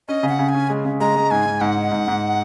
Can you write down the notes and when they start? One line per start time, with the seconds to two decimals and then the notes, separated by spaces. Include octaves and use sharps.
0.08 C#4 D#5
0.23 C#3
0.29 F#5
0.39 C#3
0.49 G#5
0.54 C#4
0.70 G#3
0.85 C#3
1.00 G#3 A#5
1.15 G#3
1.31 G#2 G#5
1.46 G#2
1.61 G#2 F#5
1.77 D#4
1.91 G#2
2.08 G#2